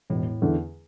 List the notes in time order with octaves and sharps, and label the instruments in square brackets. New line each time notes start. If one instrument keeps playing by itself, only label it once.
[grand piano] E1 [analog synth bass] A2
[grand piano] E2 D3